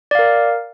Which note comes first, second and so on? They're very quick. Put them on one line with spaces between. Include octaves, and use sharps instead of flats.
D5 F5 A#4